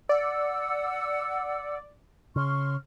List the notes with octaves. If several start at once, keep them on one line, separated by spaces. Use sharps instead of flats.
D5 F#5 E6
C#3 C6 C#6 F6